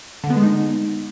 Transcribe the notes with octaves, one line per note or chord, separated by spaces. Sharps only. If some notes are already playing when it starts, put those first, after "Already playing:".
D3
B3
G#3
D#4